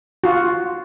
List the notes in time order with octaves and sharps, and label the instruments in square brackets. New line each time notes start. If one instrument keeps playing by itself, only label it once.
[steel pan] F4 F#4